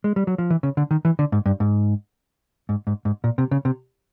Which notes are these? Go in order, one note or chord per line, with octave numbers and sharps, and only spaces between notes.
G#3
G3
F#3
F3
E3
C#3
D3
D#3
E3
D3
G#2
G2
G#2
G#2
G#2
G#2
A#2
C3
C#3
C3